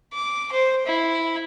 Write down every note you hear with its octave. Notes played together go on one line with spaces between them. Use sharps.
D6
C5
E4